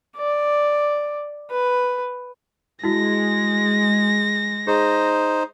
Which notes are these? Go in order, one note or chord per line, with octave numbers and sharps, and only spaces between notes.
D5
B4
G#3 E4 F#4 A#6
D#4 G#4 C5